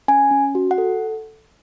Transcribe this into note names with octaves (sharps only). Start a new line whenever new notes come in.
C#4 G#5
C#4
F#4
F#5
A4